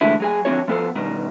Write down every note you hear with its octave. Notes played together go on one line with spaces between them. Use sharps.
E2 A2 D3 G#3 E4
F#3 G#4 G#5
D3 F3 C4 C#4 F#4 C#5
F3 B3 A4 C5
G2 B2 D#3